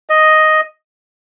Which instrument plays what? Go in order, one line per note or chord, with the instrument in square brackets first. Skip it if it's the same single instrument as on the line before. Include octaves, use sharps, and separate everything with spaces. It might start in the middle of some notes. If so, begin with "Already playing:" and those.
[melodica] D#5